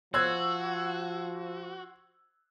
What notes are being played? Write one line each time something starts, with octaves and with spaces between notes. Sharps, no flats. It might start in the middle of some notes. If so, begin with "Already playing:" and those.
F3 F#4 C5 E6 F#6 G#6